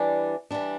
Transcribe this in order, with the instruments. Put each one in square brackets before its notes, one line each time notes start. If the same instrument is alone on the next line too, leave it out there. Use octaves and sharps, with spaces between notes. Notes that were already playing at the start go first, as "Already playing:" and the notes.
Already playing: [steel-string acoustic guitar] E3 G3 D4
E3 G3 D4